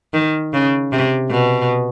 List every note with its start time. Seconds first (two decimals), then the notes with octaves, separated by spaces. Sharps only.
0.14 D#3
0.53 C#3
0.92 C3
1.31 B2